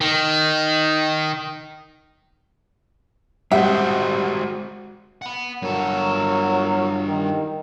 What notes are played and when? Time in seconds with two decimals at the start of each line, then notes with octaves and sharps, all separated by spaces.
0.01 D#3
3.52 G3 G#3 F#4 C5 E5 F#5
5.22 F#5 B5
5.62 G2 F#3 A4 A#4
7.06 D#3